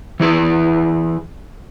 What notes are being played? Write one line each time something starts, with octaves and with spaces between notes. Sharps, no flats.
E3 E4 G#4 B4